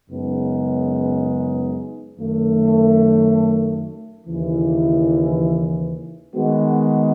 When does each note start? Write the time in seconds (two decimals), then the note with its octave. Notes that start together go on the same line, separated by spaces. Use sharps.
0.10 F#2 C#3 G#3 B3 D#4
2.19 F#2 D#3 A3
4.27 D#2 C#3 E3
6.35 D#3 G#3 B3 F#4